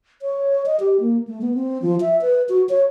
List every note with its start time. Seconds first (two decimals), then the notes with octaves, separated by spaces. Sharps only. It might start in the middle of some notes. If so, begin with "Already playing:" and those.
0.22 C#5
0.66 D#5
0.80 G4
1.00 A#3
1.28 A3
1.41 B3
1.54 C4
1.82 F3
2.01 E5
2.21 B4
2.49 F#4
2.69 C#5